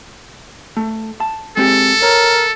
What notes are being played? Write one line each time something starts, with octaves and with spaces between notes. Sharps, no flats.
A3
A5
G#3 C4 G4 A4
A#4 C#5